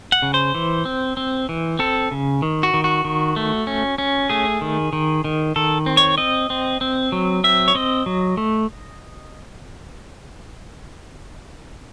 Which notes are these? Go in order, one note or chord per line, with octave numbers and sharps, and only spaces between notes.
F#5
C#3
C5
E3
C4
C4
E3
C4 A4
C#3
D#3
F#4
D#3
F#4
D#3
A3
C#4
C#4
A3 G#4
D#3
D#3
D#3
D#3 A4
C4
C#5
C4 D#5
C4
C4
F#3
C4 E5
C#5
C4 D#5
F#3
A3